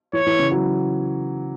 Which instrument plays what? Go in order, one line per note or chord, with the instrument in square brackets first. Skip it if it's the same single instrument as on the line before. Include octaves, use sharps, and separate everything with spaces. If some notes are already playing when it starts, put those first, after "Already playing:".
[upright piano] E3 [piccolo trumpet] C#5
[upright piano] E3
C#3
F#3